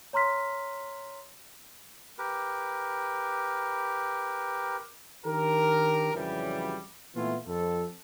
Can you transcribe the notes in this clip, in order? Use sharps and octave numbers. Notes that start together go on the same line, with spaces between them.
C#5 A#5 C6 F6 B6
G4 A#4 B4
D#3 D4 G4 A#4
F2 C#3 E3 F#3 G3
A#2 E3 A3 B3 E4 F4
F2 A4